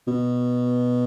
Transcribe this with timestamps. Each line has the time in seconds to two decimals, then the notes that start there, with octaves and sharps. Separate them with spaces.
0.07 B2